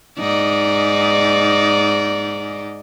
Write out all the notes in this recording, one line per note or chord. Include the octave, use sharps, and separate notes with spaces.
G#2 D#4 D5